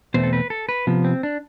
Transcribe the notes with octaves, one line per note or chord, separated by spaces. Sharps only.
E2 B2 A3 C4 C5
A4
B4
A4
B4
C3 F3 B3
C4
D4